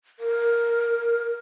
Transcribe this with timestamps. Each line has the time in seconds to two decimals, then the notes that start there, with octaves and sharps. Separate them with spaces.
0.19 A#4